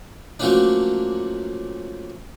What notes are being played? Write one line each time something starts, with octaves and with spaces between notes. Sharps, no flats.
F3 F#3 A3 A#3 C#4 D4